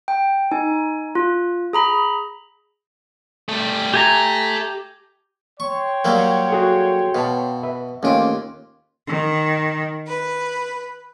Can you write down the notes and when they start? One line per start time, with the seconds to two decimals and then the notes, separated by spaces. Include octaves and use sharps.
0.08 G5
0.51 D#4 G#5
1.15 F4
1.73 G#4 A#5 B5
3.49 G3 A3
3.94 G4 A4 E5 G#5 A#5
5.60 C#5 G5 C6 C#6
6.05 F#3 G3 A#3
6.51 F#4 G#4 A4
7.15 B2 F5 A5
7.63 B4 E5
8.03 D#2 A3 C4 C#4 F4 G4 D6
9.07 D#3
10.06 B4